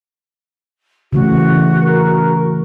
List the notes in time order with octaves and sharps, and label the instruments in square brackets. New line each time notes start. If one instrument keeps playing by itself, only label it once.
[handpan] C#3 E3 A3 [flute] F#4
[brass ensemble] A#4